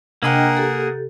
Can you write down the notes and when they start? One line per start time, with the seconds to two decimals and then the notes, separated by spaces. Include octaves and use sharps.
0.23 C3 A#3 D4 G#4 A#4 D#5 F#5 G5
0.57 G4 A4